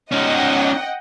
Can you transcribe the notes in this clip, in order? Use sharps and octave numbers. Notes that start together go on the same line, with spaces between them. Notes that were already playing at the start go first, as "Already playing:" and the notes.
C#4 D#4 D#5 F#5 G5